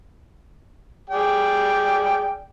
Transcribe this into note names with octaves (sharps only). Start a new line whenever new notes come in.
G#4 D5 G5